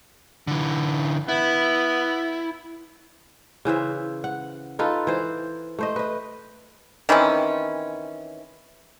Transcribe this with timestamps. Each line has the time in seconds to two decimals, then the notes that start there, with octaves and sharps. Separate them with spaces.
0.47 D3 E3
1.29 B3 E4
3.65 C#3 E3 C5 E5
4.24 F#5
4.79 D#4 F4 A4 B4
5.07 E3 C5
5.79 A3 C5 D#5
5.96 B4 D#5
7.09 D#3 E3 C4 C#4